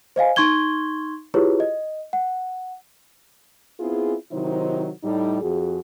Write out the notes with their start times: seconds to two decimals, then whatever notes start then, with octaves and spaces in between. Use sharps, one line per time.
0.16 C5 D#5 F5 G#5
0.36 D#4 C6 C#6 G#6 G7
1.34 E4 F4 G4 G#4 B4 C#5
1.60 D#5
2.13 F#5
3.79 B3 C4 E4 F4 G#4
4.31 C3 D#3 F#3 D#4 E4 C5
5.03 A2 G3 D#4
5.41 F2 F#4 G#4